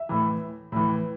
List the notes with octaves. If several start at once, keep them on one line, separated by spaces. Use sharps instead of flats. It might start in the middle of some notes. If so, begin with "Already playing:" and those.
Already playing: E5
A2 E3
A2 E3